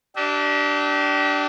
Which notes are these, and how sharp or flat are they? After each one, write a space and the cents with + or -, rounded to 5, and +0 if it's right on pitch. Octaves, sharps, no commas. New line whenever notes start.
D4 +0 G4 -30 E5 -45